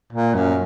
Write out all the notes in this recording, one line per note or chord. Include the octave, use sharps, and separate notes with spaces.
A#2
F#2